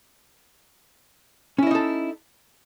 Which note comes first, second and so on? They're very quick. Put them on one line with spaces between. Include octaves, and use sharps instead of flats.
C#4 E4 D#5 D#4 A4